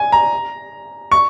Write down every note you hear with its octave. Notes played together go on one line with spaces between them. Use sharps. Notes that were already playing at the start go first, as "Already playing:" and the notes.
Already playing: G#5
A#5
C#6